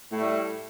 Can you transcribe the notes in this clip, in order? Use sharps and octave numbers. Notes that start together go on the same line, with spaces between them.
A2 G3 A3